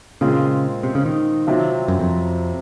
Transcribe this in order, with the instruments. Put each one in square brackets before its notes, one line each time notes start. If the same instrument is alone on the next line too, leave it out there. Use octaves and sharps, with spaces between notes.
[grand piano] A#2 G#3 C4 F4 G#4 [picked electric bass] C#3
[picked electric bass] C3
C#3
D#3
[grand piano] C3 F#3 C4 F4
[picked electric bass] F#2
F2